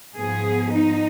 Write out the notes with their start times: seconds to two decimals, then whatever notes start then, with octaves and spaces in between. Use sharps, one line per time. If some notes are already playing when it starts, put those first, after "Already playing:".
0.15 G#2 F3 B3 G#4
0.72 D#4